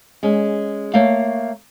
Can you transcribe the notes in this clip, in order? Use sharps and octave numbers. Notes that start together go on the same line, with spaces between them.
G#3 C#4
A3 A#3 C#5 F5